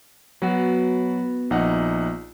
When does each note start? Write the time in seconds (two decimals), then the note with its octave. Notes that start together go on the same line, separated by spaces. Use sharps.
0.42 F#3 B3 F#4
1.51 A#1 D#4 F#5